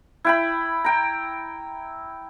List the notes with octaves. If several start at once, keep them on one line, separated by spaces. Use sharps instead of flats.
E4 G5 B5
G5 A#5